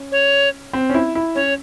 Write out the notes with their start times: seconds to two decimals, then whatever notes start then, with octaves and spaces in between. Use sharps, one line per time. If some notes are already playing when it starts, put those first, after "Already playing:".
Already playing: C#4
0.12 C#5
0.73 C4
0.90 C#4
0.94 E4
1.15 E4
1.35 C#4 C#5